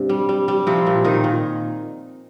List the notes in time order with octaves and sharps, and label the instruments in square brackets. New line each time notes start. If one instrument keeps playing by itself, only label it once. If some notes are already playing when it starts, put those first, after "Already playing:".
Already playing: [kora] G2 C3 C4
G3
G3
G3
C3 F3 C4
A#2
A#2 D#3 D#4
A#2